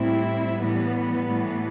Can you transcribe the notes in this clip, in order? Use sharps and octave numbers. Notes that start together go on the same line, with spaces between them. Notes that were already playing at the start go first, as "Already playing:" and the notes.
Already playing: A2 G3 C4 E4
A2 E3 G3 B3
A2 E3 G3